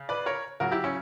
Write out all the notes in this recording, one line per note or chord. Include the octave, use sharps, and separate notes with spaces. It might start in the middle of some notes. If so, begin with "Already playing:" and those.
Already playing: C#3
B4 D5
A#4 C#5
C#3 F#3 F#4 A#4
E4 G4
C#4 E4